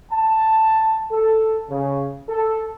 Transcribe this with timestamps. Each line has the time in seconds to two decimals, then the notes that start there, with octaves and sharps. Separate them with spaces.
0.12 A5
1.11 A4
1.70 C#3
2.29 A4